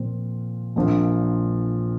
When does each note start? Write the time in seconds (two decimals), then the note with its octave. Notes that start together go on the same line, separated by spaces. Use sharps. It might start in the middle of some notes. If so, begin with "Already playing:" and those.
Already playing: A#2 F3 C4 F4
0.76 A#1 A#2 F3 C4